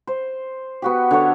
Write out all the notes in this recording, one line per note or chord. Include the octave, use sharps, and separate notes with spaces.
C5
B3 F#4 G4
D3 A4 C#5